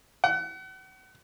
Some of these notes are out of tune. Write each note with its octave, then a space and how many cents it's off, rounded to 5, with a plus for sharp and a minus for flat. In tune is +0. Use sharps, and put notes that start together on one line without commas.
F#5 +35